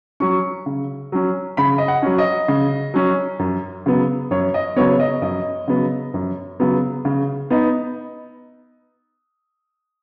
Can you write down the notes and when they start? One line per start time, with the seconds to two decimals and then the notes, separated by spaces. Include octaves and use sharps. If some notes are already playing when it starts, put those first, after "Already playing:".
0.20 F#3 C#4 C#6
0.66 C#3
1.12 F#3 C#4
1.57 C#3 B5
1.78 D#5
1.88 F#5
2.02 F#3 C#4
2.18 D#5
2.48 C#3
2.94 F#3 C#4
3.39 F#2
3.86 C#3 F#3 B3
4.31 F#2 C#5
4.54 D#5
4.76 C#3 F#3 B3 C#5
5.00 D#5
5.22 F#2 D#5
5.68 C#3 F#3 B3
6.14 F#2
6.60 C#3 F#3 B3
7.05 C#3
7.50 B3 D#4